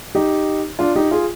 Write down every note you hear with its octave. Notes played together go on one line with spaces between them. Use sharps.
D#4 G4
D4 F4
D#4 G4
F4 G#4